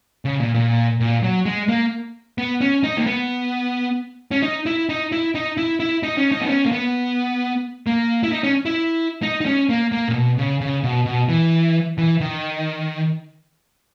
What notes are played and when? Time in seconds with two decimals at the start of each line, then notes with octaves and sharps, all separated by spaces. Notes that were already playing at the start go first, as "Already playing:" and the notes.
0.25 C#3
0.40 A#2
0.54 A#2
1.00 A#2
1.23 F#3
1.46 G#3
1.69 A#3
2.38 B3
2.61 C#4
2.83 D#4
2.97 A#3
3.06 B3
4.31 C#4
4.43 D#4
4.66 E4
4.89 D#4
5.12 E4
5.35 D#4
5.57 E4
5.80 E4
6.03 D#4
6.18 C#4
6.32 D#4
6.41 B3
6.48 C#4
6.66 A#3
6.72 B3
7.87 A#3
8.23 E4
8.32 D#4
8.44 C#4
8.65 E4
9.23 D#4
9.41 D#4
9.46 C#4
9.69 A#3
9.92 A#3
10.08 A#2
10.14 B2
10.38 C#3
10.61 C#3
10.83 B2
11.06 B2
11.29 E3
11.98 E3
12.21 D#3